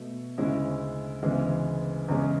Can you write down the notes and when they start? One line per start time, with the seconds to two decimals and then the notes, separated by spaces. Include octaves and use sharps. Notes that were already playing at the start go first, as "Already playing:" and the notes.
Already playing: B2 A3
0.38 D2 C#3 G#3 C#4 E4
1.23 D2 C#3 E3 G#3 B3
2.08 E2 C#3 G#3 C#4